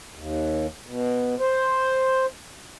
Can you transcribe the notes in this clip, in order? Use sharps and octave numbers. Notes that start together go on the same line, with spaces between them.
D#2
B2
C5